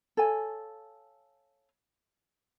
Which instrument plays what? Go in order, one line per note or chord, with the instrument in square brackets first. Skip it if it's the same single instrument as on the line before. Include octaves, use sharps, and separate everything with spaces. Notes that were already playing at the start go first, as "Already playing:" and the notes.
[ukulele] A4 C#5 F5 G#5